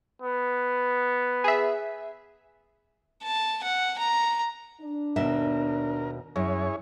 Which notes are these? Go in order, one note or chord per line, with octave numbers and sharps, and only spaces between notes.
B3
G#4 E5
A5
F#5
A#5
D4
D#2 B2 A#4 E5
F#2 E4 G#4 C#5